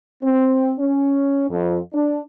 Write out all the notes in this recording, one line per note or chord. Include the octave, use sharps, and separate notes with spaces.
C4
C#4
F2
D4